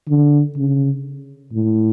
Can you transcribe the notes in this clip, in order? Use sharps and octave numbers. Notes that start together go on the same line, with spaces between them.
D3
C#3
A2